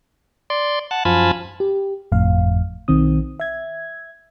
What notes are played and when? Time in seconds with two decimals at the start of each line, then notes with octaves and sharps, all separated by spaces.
0.50 D5 C6
0.91 F#5 A5
1.05 F#2 F3 F4 G#5 A5 B5
1.60 G4
2.12 G1 F2 A2 F5
2.88 B1 D#3 C4 D#6
3.40 E5 G#6